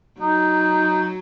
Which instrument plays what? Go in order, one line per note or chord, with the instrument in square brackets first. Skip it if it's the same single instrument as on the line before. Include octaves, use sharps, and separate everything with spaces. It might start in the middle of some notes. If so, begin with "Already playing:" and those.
[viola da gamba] F#3 [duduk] D#4